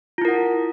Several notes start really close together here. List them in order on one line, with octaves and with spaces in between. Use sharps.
F4 E4 A#4 F#5